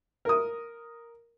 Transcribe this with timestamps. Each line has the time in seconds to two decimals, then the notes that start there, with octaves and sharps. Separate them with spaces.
0.25 A#4 D#6